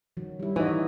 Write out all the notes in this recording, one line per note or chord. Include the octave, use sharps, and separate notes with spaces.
D#3 F#3
G3 E4
E3 D#4 F#4 D#5
E5